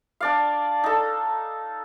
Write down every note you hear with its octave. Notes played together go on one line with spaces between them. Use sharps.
D4 D5 F5
D#4 A4